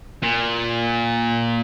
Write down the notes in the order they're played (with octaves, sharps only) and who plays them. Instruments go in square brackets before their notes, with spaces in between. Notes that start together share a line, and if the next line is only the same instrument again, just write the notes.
[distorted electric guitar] A#2